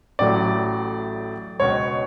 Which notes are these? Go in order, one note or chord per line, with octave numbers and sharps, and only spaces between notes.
A1 A2 F#3 A3 D5
C#2 B2 G#3 C#5